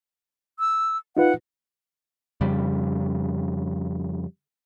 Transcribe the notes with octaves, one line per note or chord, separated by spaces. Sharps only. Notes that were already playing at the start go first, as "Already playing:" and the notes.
E6
D#4 F4 B4 F#5
F2 C#3 G3